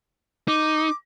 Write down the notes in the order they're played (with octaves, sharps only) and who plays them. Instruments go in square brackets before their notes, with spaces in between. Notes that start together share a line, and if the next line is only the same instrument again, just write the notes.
[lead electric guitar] D#4 [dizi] D6